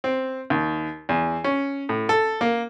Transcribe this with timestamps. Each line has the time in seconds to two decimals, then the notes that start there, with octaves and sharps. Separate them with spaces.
0.04 C4
0.50 D#2
1.09 E2
1.44 C#4
1.89 A2
2.09 A4
2.41 A#3